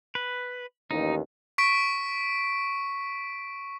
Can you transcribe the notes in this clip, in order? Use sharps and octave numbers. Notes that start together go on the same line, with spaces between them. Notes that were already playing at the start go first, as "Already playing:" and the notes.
B4
A1 D#2 D#4
C#6 B6 D7